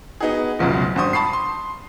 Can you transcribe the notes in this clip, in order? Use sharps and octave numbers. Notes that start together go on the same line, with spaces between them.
B3 D#4 F#4 G#4
F1 C#2 F#2 B2
G#1 G2 F#4 C5 C#6 D#6
A5 B5 C#6 C7
C6